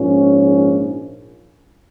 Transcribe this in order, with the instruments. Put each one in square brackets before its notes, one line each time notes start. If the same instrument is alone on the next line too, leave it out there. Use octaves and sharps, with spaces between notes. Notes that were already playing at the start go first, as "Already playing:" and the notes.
Already playing: [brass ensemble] A#1 G#2 F3 A#3 C#4